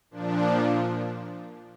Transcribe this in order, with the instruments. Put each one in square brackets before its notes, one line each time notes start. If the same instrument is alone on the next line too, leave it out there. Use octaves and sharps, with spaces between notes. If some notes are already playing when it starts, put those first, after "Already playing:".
[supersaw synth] A#2 F3 D4